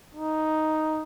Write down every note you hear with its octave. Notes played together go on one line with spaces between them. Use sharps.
D#4